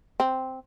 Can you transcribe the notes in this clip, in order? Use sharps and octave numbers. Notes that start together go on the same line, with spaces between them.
C4